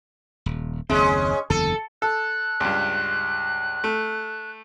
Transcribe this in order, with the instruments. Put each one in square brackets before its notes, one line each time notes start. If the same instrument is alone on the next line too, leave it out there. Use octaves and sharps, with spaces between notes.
[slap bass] D#1
[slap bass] F#1 D#2 C4 [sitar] G#3 C#4
[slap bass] F#1 E2 D3 [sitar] A4
[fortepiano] A4 [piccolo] F#6
[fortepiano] C#2 G2
A3